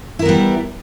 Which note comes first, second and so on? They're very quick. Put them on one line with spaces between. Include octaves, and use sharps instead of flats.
E4 A#4 B3 G3